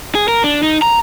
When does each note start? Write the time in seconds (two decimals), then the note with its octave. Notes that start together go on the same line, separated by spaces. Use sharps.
0.15 G#4
0.28 A#4
0.44 D4
0.63 D#4
0.82 A#5